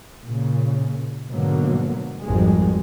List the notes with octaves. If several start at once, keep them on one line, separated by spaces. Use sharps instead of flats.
A#2 C#3
G#2 B2 D3 F#3 A#3
G#1 F2 G3 G#3